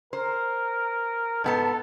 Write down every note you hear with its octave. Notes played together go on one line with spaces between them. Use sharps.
A#4 C5
G#2 B3 A4 A5